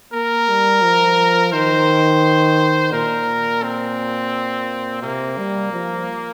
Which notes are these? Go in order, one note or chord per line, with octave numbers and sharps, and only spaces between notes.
A#3 A#4
G3
F3
D#3 C5
A#2 A#4
C4
C3 A#3
G3
F3